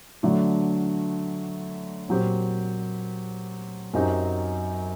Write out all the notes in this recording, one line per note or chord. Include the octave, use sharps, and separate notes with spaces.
D3 F#3 A3 D4
A#2 F#3 C4 G4
F#2 F#3 C4 D#4 G4